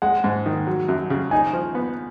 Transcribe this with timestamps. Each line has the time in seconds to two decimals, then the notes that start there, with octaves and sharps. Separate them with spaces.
0.02 G#3 F#5
0.24 G#2
0.46 D#3
0.67 F#3
0.89 F#2
1.10 C#3
1.31 D#4 G#5
1.53 F3
1.75 B3